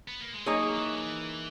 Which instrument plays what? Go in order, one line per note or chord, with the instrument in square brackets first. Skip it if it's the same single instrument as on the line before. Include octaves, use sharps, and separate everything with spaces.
[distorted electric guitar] B3
A#3
G#3
[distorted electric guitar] F#3 [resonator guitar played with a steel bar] A#3 D#4 G#4 C#5
[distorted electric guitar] E3
F#3
E3